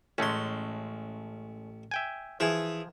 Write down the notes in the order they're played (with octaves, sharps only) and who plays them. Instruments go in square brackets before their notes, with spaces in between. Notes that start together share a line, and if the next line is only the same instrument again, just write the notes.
[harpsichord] A1 C6 [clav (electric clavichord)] G#3 A3 C#4
[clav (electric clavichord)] E5 G5 G#5
[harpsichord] E3 G#4 [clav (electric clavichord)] F3 G#5